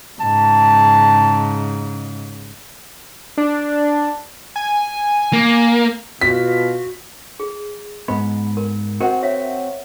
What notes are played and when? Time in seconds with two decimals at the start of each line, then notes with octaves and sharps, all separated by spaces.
0.20 G#2 C#3 A5
3.37 D4
4.56 G#5
5.33 A#3
6.21 B2 F4 F#4 B6
7.40 G#4
8.08 G#2 B3 D#5 B5
8.57 A#4
9.01 C4 F#4 A#4 D#5 F#5
9.23 C#5 E5 F5